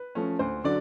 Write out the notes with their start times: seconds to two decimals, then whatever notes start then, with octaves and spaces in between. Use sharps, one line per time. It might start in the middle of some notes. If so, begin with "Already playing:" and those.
Already playing: B4
0.15 F3 A3 C#4
0.39 D2 C5
0.64 D3 F#3 D5